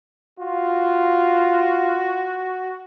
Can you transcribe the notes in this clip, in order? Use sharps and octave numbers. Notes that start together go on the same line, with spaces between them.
F4 F#4